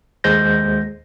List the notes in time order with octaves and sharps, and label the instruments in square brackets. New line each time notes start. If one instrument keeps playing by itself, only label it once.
[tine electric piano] D#2 G#3 C5 G6 A#6